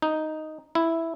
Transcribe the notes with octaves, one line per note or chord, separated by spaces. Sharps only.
D#4
E4